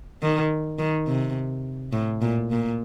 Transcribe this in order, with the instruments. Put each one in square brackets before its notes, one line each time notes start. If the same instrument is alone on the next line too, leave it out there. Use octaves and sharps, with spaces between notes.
[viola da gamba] D#3
D#3
C3
A2
A#2
A#2